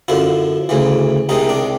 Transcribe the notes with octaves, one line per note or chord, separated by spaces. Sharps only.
F#2 D3 F3 E4
D2 C#3 E3
C2 C3 D#3 G#3 D#4
D4